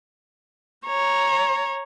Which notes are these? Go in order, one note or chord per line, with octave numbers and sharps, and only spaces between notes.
C#5 A#5